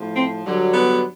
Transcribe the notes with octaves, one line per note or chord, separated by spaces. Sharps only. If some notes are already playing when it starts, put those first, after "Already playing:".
Already playing: A2 F3
C4
G2 D3 F#3
B3